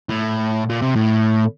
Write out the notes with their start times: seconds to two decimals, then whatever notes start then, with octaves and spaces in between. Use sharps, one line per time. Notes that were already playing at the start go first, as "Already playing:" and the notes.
0.09 A2
0.70 A#2
0.82 C3
0.96 A2